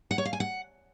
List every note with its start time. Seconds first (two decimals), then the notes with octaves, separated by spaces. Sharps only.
0.11 F#5
0.18 C#5
0.25 F5
0.33 G#5
0.40 F#5